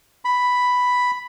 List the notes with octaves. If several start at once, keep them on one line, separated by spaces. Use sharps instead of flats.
B5